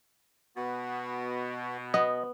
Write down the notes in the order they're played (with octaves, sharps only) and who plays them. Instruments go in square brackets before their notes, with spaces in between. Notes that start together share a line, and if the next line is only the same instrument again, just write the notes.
[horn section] B2 [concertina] B3 F#4
[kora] B3 [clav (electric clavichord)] D#5